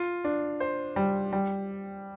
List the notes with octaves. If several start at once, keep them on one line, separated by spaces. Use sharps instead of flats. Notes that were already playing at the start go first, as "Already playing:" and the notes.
Already playing: F4
D4
C5
G3
G3